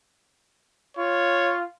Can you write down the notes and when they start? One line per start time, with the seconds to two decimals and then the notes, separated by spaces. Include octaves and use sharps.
0.97 F4 C#5